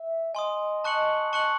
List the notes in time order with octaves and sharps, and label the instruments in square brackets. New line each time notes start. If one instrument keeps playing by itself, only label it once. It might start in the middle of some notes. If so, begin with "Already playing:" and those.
Already playing: [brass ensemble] E5
[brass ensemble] D#5 [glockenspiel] G#5 C6 D#6
[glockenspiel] A5 C#6 F#6 C#7 F#7
A5 C#6 F#6 C#7 F#7